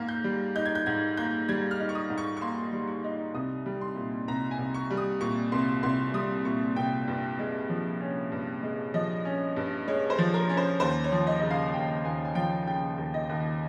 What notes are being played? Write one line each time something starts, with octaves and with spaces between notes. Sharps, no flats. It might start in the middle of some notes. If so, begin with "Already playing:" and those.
Already playing: G#2 A#3 F6
G6
G3
D#4 G6
G#6
G6
G#2 G#6
A#3 G6
G3 G#6
F6
D#4
C#6
D#6
G#2
C#6
C#6
A#3 C6
G3
C#6
D#4
C2 D#6
G3
C6
A#2
C2 A#5
G#5
C2
C#6
G3
D#6
A#2 C#6
C2 C6
C2 C6
G3 D#6
A#2 C#6
C2 G5
G2
G#3
F3
C#4
G2
G#3
F3 D#5
C#4
G2
G#3 C#5
C5
F3
A#4
C#4
C5
D#2 C5
C#5
F3
D#5
C#3 D#5
F5
D#2 G5
D#2 G#5
G#5
F3 G5
C#3 G5
D#2
D#5
D#2